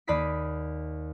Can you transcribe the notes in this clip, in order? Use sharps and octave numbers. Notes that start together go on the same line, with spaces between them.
D#2 D5 B5 D#6 B6 C7